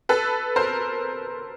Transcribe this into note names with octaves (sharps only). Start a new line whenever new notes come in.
A4 B4
A#4 C5